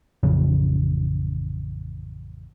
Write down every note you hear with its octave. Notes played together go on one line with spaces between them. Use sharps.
A1 F2 C#3